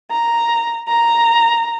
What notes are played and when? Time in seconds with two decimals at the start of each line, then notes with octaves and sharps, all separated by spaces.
0.11 A#5
0.88 A#5